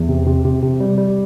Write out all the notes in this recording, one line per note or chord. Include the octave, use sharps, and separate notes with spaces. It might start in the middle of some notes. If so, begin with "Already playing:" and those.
Already playing: E2
C3
C3
C3
C3
G3
G3